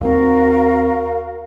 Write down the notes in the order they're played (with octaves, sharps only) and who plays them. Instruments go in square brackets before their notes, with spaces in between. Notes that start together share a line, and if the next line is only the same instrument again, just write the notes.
[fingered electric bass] D#2 G3 C4 [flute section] F#4 A#4 F5